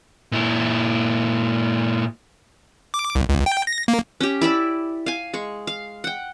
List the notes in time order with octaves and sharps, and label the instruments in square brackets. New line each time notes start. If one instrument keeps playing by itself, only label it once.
[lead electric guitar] A#2 E4
[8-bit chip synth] D6
C2
C#2
G5
A#6
A#3
[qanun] C#4 G4
E4 D5 E5 B5
F5 G#5
G#3 C#6
F5
F#5 G5